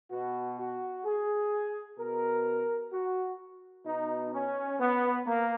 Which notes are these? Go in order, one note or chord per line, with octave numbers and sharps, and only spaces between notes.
B2 F#4
F#4
G#4
B2 A#4
F#4
B2 D#4
C#4
B3
A#3